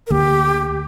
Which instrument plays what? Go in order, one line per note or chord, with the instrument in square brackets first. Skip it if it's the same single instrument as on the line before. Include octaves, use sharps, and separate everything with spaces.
[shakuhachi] A#4
[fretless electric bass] D2 D3 A#3 [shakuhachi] G4